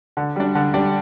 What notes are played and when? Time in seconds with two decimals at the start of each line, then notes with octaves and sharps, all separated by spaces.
0.17 D3
0.36 G3 D4
0.55 D3
0.74 G3 D4